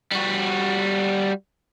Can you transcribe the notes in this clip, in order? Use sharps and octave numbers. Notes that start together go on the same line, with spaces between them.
G3 F#4